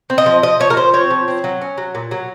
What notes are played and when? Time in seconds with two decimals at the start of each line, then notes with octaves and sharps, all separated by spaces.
0.10 C4
0.18 D#5
0.26 F3
0.43 F3 D#5
0.60 F3 C#5
0.70 A#4
0.77 F3 C5
0.94 C4 C#5
1.11 F3
1.28 C4
1.44 F#3
1.62 C#4
1.78 F#3
1.95 A#2
2.11 F#3